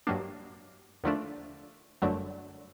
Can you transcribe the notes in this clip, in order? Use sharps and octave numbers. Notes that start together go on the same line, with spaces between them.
G2 D#3 F#3 A#3 D4
D#2 D3 F3 A3 D4
G1 F#2 D3 F#3 A3